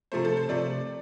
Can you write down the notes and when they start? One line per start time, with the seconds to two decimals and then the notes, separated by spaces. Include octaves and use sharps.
0.12 C3 F3 A3 C5
0.25 A4
0.37 C5
0.49 C3 F3 A3 D5